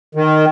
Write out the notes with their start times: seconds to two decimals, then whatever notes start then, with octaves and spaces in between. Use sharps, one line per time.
0.15 D#3